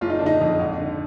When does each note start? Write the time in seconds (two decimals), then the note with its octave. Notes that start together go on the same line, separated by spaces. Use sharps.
0.01 F#1 F4
0.10 D#4
0.19 D3 D4
0.26 D#4
0.41 F2
0.59 G#1
0.79 D3